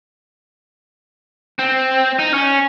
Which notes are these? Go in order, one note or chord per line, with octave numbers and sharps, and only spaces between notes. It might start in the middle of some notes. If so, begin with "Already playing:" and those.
C4
D#4
C#4